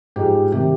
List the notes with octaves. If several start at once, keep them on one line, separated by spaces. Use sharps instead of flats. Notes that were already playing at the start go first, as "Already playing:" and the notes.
G#2 F3 G#3 G4
C3 D#3 G3 G4